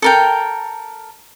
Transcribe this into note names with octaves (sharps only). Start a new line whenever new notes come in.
A4 A#4 G5